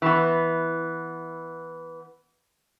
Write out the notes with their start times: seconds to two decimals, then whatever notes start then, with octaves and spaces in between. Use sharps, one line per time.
0.02 E3 B3